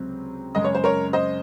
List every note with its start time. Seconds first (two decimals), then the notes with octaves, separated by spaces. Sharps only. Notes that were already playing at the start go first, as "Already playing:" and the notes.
Already playing: C#2 C3 F#3 C4
0.55 F#2 C#3 G#3 D#5
0.64 C#5
0.75 C5
0.84 A#4 C#5
1.13 C5 D#5